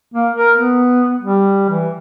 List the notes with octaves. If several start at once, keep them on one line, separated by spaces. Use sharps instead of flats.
A#3
A#4
B3
G3
E3